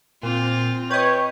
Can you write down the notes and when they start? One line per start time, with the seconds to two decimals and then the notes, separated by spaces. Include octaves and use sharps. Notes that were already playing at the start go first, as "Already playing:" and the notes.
0.23 A#2 C4 F4
0.91 B4 C#5 D#5 G5